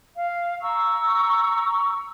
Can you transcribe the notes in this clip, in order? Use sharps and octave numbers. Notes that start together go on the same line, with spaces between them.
F5
A#5 C#6 E6